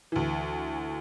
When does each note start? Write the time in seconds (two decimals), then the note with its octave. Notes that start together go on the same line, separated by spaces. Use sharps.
0.12 D2 E3